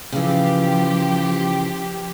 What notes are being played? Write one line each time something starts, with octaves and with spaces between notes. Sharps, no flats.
C#3 E3 F3 G4